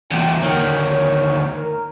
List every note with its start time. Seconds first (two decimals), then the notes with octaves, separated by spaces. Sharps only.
0.11 E2 A#2 G5
0.43 D2 D#3 C#5
0.79 C#5
1.56 A#4